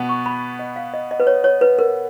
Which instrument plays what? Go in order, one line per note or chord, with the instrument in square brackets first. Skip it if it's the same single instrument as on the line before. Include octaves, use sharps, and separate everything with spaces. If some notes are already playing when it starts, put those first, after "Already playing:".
Already playing: [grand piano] B2 B3
[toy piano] C#6
B5
D#5
F5
D#5
D#5
B4
C#5
C#5
B4
A#4